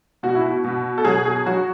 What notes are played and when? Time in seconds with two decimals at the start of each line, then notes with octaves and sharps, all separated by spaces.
0.23 B2 F#4
0.35 E4
0.46 F#4
0.64 B2
0.98 A4
1.05 F#3 G#4
1.25 G#4
1.46 F#3 F#4